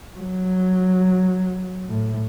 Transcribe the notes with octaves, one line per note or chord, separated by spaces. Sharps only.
F#3
A2